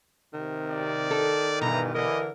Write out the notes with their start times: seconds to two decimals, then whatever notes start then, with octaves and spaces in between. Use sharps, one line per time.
0.34 C3 D#3
0.71 D5
1.11 A4
1.61 G2 B2 E3 A#5
1.94 D3 E3 A#4 D#5